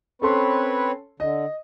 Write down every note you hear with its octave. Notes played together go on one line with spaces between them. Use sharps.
C4 C#4 A4 B4 C#5 C6
D3 D#5